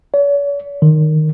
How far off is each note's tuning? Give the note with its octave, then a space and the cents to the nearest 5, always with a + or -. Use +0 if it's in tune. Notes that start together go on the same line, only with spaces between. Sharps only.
C#5 +45
D#3 -10